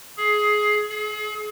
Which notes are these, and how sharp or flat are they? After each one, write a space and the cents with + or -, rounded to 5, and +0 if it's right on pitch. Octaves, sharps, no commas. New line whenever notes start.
G#4 +15
G#4 +40